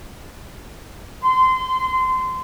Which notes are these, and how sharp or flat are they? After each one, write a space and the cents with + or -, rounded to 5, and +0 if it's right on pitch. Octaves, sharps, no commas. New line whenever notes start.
C6 -25